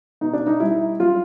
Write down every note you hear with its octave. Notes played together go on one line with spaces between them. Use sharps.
B2 D#4
D4
D#4
G3 E4
F#3 F4